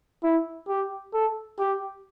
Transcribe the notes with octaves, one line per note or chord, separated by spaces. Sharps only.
E4
G4
A4
G4